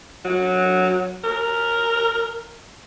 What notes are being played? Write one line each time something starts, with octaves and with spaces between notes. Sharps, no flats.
F#3
A#4